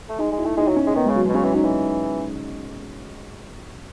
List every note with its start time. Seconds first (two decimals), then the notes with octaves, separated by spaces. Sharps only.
0.09 A3
0.18 G#3 D#4
0.32 G#3
0.38 E4
0.45 A3
0.57 G#3 D#4
0.68 F#3
0.76 C#4
0.87 G#3
0.95 D#3 B3
1.05 G#3
1.09 C#3
1.15 F#3
1.26 G#3
1.29 B2
1.34 C#3 C#4
1.44 E3
1.54 F#3 D#4
1.64 E3